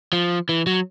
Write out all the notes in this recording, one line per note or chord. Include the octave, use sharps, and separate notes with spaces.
F3
E3
F#3